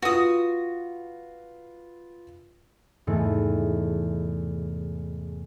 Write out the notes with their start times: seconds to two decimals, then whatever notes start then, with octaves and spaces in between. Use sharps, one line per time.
0.02 F4 F#4 B4 D#6
3.07 E2 G#2 C3 E3 A3